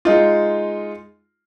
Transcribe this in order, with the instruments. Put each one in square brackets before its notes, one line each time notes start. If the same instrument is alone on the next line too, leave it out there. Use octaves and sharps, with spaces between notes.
[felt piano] G#3 D#4 F4